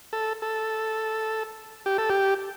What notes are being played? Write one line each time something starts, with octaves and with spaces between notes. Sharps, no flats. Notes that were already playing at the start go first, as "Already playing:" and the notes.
A4
A4
G4
A4
G4